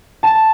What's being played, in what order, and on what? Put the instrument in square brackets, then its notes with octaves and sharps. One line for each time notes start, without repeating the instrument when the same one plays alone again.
[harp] A5